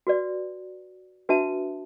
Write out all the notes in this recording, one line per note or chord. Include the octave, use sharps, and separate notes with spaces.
F#4 B4 D5
D4 F#4 B4 E5 A5